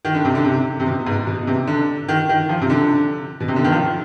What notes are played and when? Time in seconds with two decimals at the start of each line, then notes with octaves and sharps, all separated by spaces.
0.05 D#3
0.15 D3
0.25 C3
0.35 D3
0.45 C3
0.80 C3
0.86 B2
1.06 G#2
1.27 B2
1.47 C3
1.67 D3
2.09 D#3
2.29 D#3
2.49 F3
2.61 C3
2.70 D3
3.40 B2
3.48 C3
3.56 D3
3.64 D#3
3.72 F3